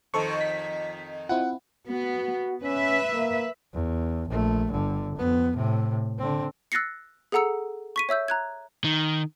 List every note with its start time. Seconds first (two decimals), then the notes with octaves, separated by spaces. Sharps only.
0.14 F2 D#3 A4 C5 C#6
0.41 B6
1.29 C4 E4 F4 F#5
1.87 B3 F#4
2.63 C#4 B4 E5
3.14 A#3
3.73 E2
4.29 A#1 A3
4.71 G1 D3
5.16 F2 B3
5.54 A2 C3
6.19 D3 C4
6.72 E6 F#6 A6 A#6 C7 C#7
7.32 G#4 A4 F#5 A#5 E6 C#7
7.96 C#6 B6 D#7
8.09 C#5 E5 E6 G6
8.28 A#5 F#6 G#6
8.84 D#3